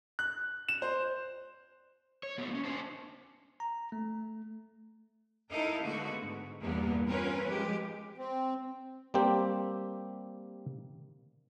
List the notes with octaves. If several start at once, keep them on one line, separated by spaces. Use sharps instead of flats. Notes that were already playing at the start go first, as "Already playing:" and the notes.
F#6
E7
C5
C#5
A3 B3 F#4
A#3 C#4
C#4 D4 C5 G#5 A5
A#5
A3
D#4 E4 A4 A#4 D#5 F5
D3 G#3 A3 B3 F#4
G#2
E2 G2 A#2 A#3 B3
C4 C#4 F4 A#4 B4
F3 G#3 G4
C4
G3 A#3 C4 G4